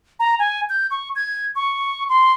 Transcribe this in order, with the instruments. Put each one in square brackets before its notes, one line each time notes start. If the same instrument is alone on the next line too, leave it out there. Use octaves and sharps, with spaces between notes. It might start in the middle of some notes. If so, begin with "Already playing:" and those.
[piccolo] A#5
G#5
G6
C#6
G#6
C#6
C6